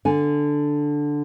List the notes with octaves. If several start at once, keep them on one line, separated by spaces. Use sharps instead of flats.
D3 G#5